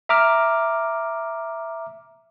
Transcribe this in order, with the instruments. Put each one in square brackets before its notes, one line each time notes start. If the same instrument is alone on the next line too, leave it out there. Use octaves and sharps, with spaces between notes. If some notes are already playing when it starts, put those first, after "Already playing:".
[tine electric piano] E5 A#5 D6 F6